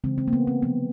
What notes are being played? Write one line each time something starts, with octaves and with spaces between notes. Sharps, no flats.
C#3 E3 G#3 C4
C4
A#3
B3
C4
C3 F3 A3 B3